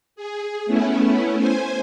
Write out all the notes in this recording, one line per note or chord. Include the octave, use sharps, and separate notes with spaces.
G#4
A3 B3 C#4 E4
C5 G#5